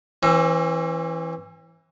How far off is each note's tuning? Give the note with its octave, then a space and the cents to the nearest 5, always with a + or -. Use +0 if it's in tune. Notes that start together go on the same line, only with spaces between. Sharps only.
E3 +0 C4 +45